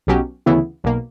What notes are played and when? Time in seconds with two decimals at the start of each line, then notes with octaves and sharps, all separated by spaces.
0.07 B1 B2 F#3 C#4 G4
0.46 D2 C#3 E3 B3 E4
0.84 B1 B2 A#3